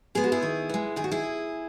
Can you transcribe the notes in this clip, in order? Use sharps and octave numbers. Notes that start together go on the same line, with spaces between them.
G#3 B3 G#4
F#4
E4 G#4
D#3
G#3 B3
D#3 G#4
F#4
E4 G#4